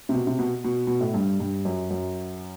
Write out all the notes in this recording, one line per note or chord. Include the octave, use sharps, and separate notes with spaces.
C3
B2
C3
B2
B2
B2
A2
G2
G2
F#2
F#2